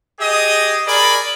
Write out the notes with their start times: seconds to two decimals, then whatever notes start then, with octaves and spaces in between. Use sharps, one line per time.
0.20 G4 G#4 D#5 D#6
0.87 G#4 A#4 D5 B5